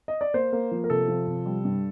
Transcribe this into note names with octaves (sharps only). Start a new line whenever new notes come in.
D#5
D5
A#3 C5
A#3
F3
A#4
C3 A4
F3
C3
G3
G2